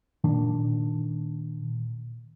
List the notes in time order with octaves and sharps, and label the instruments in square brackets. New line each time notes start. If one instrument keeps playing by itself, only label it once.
[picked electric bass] A#2 D#3 D4